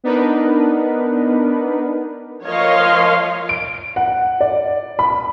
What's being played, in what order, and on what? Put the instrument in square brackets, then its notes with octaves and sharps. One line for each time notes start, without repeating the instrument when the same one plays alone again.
[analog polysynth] B3 D4 D#4 A#4 B4
[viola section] F3 A#4 C#5 D#5 F5 C6
[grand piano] D7
F#5
D5
B5